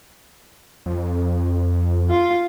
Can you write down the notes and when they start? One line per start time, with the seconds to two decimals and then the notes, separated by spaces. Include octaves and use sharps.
0.86 F2
2.10 F4 F5